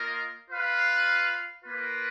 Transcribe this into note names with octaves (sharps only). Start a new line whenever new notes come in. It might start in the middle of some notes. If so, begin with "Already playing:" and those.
Already playing: A#3 F4 A#4 D#5
F4 B4 F5
A#3 F4 B4